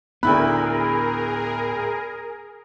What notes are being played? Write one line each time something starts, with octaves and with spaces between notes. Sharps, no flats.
D2 A2 B3 E4 G#4 A#4 B5 F#6